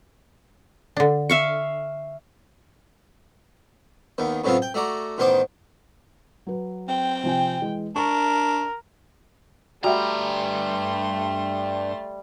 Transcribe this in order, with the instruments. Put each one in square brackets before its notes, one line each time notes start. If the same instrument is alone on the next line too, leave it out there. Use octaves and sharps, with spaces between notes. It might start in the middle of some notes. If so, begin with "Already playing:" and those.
[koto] D3 D4
[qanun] E5 F5 C#6
[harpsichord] D#2 D#3 B3
A2 C#3 F#3 B3 C4 F4
G5
A3 F#4 D5 A#5
A1 D#3 B3 B4 C5 D6
[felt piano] F#3 B4
[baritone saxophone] C4 [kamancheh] G5
[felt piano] C3 F3 G#5
E3 G#3
[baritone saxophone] D4 [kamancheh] A#4 [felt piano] C#6
[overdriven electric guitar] G2 A#5 [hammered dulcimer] G3 [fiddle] A3 C6 [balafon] F#4 E5 F#5